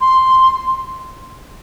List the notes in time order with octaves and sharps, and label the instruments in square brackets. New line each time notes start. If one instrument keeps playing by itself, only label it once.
[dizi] C6